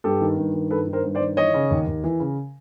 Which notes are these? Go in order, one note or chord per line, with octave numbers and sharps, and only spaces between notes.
G2 G4 A4
D#3
G2
D#3
G2 A4 B4
D#3
A#4 C5
G2
C5 D5
D#3
E3 C#5 D#5
C#3
D#2
D#2
E3
C#3